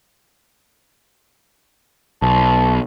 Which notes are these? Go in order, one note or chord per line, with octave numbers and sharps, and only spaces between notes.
B1 A5